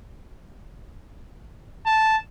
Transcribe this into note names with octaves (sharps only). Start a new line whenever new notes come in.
A5